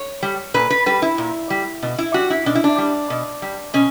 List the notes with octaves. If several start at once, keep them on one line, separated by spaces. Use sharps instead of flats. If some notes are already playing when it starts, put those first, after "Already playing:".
Already playing: C#5
G3
A#2 B4
B4
G3 B4
E4
A#2
G3
B2
E4
G3 F#4
E4
B2 D4
E4
D4
G3
B2
G3
B2 C#4